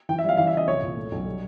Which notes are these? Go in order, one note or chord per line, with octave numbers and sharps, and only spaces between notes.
E3 G5
E5
G3 F5
E3 F5
E5
C#3 D#5
C2 C#5
A#2
A3
B1
G3